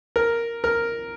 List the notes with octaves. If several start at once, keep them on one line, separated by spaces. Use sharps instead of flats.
A#4
A#4